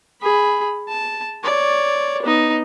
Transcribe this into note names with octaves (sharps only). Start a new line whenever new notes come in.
G#4 B5
A5
C#5 D5
B3 D#4